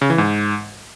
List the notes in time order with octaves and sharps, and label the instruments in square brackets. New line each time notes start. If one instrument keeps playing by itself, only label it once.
[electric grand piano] C#3
E3
G#2